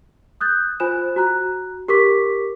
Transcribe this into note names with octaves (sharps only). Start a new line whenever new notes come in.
D#6 F#6 G6 A6
F4 C5 G#5 B5 F#6 E7
F#4 A#5 F#6
G4 A#4 C#6 D6 B6